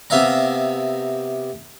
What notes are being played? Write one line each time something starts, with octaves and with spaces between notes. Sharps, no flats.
C3 B3 E5 F5 A#5